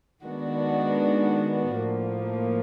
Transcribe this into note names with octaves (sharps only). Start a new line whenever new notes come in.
D#3 G#3 B3 D4 F#4
A2 F3 A#3